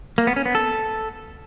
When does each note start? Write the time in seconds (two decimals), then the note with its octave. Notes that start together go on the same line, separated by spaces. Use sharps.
0.18 A#3
0.27 B3
0.36 C#4
0.46 B3
0.55 A4